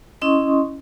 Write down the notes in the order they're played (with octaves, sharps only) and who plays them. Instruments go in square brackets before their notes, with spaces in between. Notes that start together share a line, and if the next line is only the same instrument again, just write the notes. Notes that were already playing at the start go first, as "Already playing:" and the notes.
[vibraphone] C#4 E4 D#5 C6 C#6 D#6